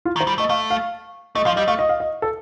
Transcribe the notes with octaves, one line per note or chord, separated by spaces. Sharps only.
F4
D#3
C5
G3
A3 D#5
A3 F5
F5
A3 D#5
F3 F5
G3 D#5
A3 F5
D#5
F5
D#5
A4